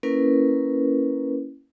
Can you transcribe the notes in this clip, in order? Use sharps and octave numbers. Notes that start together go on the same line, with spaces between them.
A#3 C#4 E4 A#4 B4